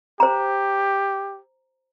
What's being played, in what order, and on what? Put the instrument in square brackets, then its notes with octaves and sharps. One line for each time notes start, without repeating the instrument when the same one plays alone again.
[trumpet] G4 [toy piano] C5 A#5